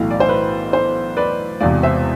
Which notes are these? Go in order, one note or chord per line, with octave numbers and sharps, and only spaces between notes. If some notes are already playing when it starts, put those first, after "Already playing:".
Already playing: B1 A2 E3 F5
D5
C5
B4
C5
B4 D5
E1 E2 C3 D5 F5
C5 E5